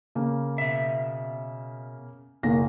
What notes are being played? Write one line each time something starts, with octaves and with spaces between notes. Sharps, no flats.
C#3 A#3
B2 E5
F#1 B1 A#3 A#6